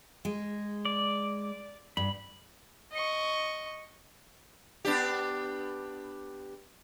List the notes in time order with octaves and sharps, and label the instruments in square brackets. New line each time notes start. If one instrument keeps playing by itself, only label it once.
[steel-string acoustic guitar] G#3
[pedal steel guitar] D5
[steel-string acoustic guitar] G2 [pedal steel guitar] B5
[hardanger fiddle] D#5 C#6
[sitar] B3 D4 G4